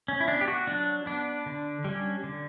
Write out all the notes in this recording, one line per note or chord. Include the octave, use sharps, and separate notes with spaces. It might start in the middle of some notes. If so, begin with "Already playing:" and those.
C#4
E4
B3 D4
G4
F#4
F#3 D4
B3 D4
D3
G3 C#4
D3